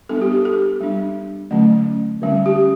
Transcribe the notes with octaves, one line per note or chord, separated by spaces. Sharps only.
G3 B3 D4 A4
G4
A4
A4
G3 D4
D3 F#3 A3 C#4
D3 G3 C#4
G4